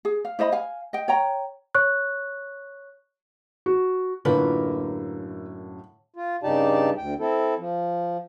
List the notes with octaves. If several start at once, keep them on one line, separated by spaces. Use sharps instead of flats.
G#4
F5
E4 C5 D#5 B5
F5 G#5
D#5 G5
C#5 G5 A#5
C#5 C#6 F#6
F#4
F#2 A2 D3 A#3 F4 B4
F4
G2 C#3 D#4 G4 D5 A5
D2 G5
C4 E4 A4
F3